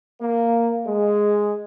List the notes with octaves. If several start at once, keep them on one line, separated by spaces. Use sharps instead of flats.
A#3
G#3